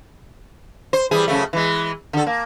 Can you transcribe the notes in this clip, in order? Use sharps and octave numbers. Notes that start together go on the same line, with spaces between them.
C5
E3 G3 G#4
F#2 C#3 A3
E3 G#3
D3 A4
A#3